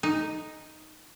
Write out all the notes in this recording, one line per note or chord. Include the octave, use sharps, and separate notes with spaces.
D#4